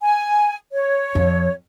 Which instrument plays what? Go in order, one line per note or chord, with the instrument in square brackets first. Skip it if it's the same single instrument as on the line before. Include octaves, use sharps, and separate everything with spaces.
[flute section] G#5
C#5
[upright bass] F2